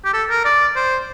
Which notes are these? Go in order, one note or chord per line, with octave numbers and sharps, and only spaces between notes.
G4
A4
A#4
D5
C5